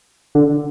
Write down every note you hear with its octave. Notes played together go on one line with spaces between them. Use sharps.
D3